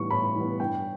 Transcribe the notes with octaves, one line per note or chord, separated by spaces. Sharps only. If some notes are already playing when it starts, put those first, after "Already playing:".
Already playing: A2 E3 G3 B3 C#6
A2 B5
E3 G3 B3
G2 G5